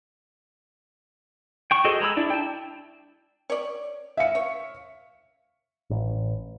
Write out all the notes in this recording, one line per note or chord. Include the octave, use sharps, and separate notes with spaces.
G5 C#6
F#4 G#4 A4 C5 D#5
G#3 A#5 B5 E6
D4 E4 D5
G5 A5
C#5 D5
E5 F5 C#7
C#5
A1